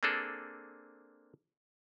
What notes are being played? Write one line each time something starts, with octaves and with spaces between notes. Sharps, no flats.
A#3 C4 D4 G#4 A4